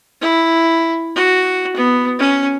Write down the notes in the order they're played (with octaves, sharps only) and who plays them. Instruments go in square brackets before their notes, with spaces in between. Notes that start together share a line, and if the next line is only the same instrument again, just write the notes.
[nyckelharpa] E4
F#4
B3
C#4